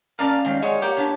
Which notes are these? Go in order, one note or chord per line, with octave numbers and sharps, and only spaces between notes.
A#2 A3 C#4 A#4 D5 F5 A5
G#1 D#3 F#3 G3
G#3 C#5 F#5
A#3 G4
C#4 D4 E4 A5